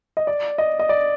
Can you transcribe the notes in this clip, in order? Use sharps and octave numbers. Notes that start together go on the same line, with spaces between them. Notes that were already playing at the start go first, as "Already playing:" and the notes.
D#5
D5
D#5
D#5
D5